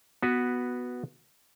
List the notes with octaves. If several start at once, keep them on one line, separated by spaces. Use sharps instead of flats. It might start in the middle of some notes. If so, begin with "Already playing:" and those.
B3 F#4 B4